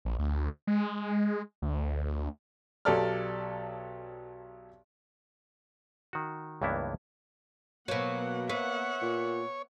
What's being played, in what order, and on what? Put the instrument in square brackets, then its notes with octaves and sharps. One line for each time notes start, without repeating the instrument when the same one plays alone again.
[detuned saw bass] A#1
D2
G#3
D2
[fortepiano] B1 F#3 G4 A4 D5 F6
[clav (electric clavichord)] D#3 F#4
C#2 G2 E3 A#3 B3 E4
[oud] B2 F#3 [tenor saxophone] A#3 [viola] B3 F#5
[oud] B3 [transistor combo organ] C#5 [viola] E5 F#5
[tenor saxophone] A#2